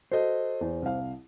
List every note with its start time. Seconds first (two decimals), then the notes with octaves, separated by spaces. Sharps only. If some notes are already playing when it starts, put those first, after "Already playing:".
0.12 F#4 A4 C5 D#5
0.61 E2
0.82 C2 F5